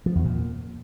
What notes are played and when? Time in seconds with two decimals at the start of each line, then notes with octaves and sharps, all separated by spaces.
0.06 F3
0.15 E2
0.25 A#2